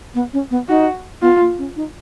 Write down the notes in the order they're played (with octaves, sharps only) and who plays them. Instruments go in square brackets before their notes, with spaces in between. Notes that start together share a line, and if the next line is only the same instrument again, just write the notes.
[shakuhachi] B3
C#4
B3
[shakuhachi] D#4 [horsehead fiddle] F#4
[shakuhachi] B3 [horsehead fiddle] F4
[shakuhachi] A#3
C#4
D#4